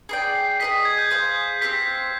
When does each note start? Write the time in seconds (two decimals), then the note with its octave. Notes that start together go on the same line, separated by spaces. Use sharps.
0.09 G#4 B4 D5 G5 C7
0.35 C7
0.60 G#4 B4 D#5 B6
0.72 C7
0.85 G#6
0.98 G6
1.11 G#4 C5 F5
1.61 C4 G4 C5 F5 B6